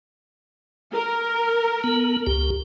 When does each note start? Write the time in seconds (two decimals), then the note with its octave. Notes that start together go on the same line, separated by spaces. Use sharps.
0.94 A#4
1.84 B3
2.27 C#2 G4